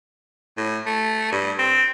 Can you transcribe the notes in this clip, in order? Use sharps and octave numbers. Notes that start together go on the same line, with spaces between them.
A2
A3
G2
C4